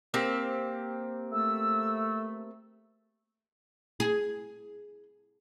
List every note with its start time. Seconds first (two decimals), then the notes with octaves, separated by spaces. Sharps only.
0.14 A#3 C4 G4
1.31 A3 E6
4.00 G#4